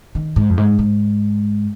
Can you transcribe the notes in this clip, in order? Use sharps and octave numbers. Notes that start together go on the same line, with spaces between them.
D#3
G#2
F2
G#2
G#2